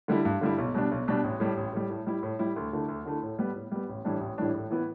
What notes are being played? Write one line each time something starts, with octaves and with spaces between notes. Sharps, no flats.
D3 G3 E4
G2
D3 G3 E4
B1
B2 G3 D4
B1
B2 G3 D4
A1
A2 G3
A1
A2 G3
A2
G3 E4
A2
G3 E4
D2
D3 A3 E4
D2
D3 A3 E4
A2
G3 B3
A2
G3 B3
A1
A2 E3 G3 D4
A1
A2 E3 G3 D4
A2
E3 B3 E4